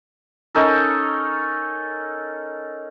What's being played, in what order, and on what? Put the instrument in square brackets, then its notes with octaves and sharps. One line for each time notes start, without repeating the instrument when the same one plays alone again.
[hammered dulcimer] C#4 D#4 A4 A#4